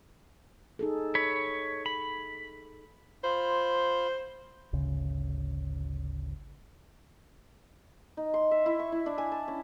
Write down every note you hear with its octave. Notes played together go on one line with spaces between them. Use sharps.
D#4 G#4 A4
C#5 B5
B5
F4 C5 B5
G#1 D2 C#3
D#4
C6
E5
E4
C#6
E4
D4
G#5
A5
C#4